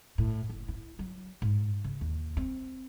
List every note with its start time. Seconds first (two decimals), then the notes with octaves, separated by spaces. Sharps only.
0.18 A2
0.49 F#1
0.68 E4
0.99 F#3
1.42 G#2
1.84 C#3
2.01 D#2
2.37 C4